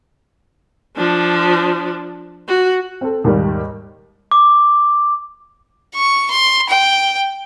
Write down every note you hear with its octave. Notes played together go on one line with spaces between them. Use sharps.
F3 D4
F#4
C4 A4
D#2 G#2 D#3 G3 A#3
D6
C#6
C6
G5